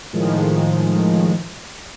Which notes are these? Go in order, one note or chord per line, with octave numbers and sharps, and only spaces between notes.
A2 D#3 F3 G#3